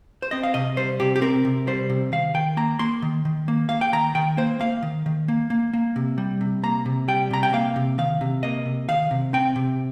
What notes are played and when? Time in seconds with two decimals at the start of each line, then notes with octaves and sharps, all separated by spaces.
0.22 C5
0.31 C4 D#5
0.43 F5
0.54 C3 D#5
0.77 G3 C5
1.00 C3 G4
1.16 G4
1.22 C4 A#4
1.45 C3
1.67 G3 C5
1.90 C3
2.12 D#3 F5
2.34 D#3 G5
2.57 A#3 A#5
2.79 A#3 C6
3.02 D#3
3.25 D#3
3.48 A#3
3.69 A#3 F5
3.81 G5
3.93 D#3 A#5
4.15 D#3 G5
4.37 A#3 C5
4.60 A#3 F5
4.83 D#3
5.06 D#3
5.28 A#3
5.50 A#3
5.73 A#3
5.96 C3
6.18 G3
6.41 C3
6.63 A#3 A#5
6.86 C3
7.08 G3 G5
7.31 C3 A#5
7.43 G5
7.53 A#3 F5
7.76 C3
7.98 D#3 F5
8.21 C3
8.43 A#3 D#5
8.66 C3
8.88 D#3 F5
9.11 C3
9.33 C4 G5
9.56 C3